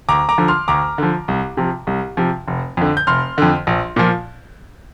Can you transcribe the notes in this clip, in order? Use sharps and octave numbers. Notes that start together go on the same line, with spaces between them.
D2 A#5 D6
A#5 D6
D3 F3
C6 F6
D2 A#5 D6
D3 F3
C2
C3 F3
C2
C3 F3
F1
F2 D3
G6
F1 C6 F6
F2 D3
A#1
A#2 F3